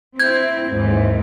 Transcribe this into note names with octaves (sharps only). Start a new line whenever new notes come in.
C4 E4 G6 G#6
D#2 G#2 E3